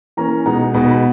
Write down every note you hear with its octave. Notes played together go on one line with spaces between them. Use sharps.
E3 A#3 C#4 A#5
B2 G#3 B3 D#4 A#5
B2 G#3 B3 D#4 B5
B5